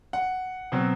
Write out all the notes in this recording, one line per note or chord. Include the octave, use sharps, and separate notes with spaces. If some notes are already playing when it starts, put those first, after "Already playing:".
F#5
B2 F#3 C4